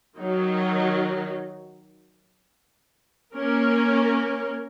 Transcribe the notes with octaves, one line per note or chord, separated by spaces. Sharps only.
D#3 F#3 D#4
A#3 C#4 A#4